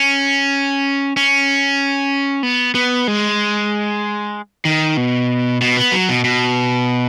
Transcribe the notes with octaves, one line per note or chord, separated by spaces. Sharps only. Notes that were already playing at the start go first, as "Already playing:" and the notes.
Already playing: C#4
C#4
B3
B3
G#3
D#3
B2
B2
B3
F#3
B2
B2